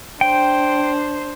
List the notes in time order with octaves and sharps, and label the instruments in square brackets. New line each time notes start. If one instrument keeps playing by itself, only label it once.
[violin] D4 C5 [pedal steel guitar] G5